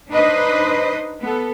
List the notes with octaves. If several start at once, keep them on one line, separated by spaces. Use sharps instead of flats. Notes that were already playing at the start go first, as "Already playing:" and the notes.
D4 D#4 B4 C5 D#5
B3 A4